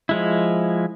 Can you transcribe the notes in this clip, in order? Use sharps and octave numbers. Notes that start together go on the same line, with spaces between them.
F3 G#3 E4